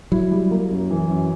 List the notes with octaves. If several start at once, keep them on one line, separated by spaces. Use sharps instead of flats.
F#3 E4
G3
A#3
F#2
E3
F#2